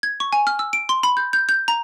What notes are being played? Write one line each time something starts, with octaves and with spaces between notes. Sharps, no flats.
G#6
C#6
G#5
F6
E6
D7
C6
B5
G6
G6
G6
A#5